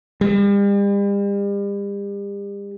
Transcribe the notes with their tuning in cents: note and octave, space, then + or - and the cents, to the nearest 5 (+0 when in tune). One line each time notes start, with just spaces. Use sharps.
G3 +40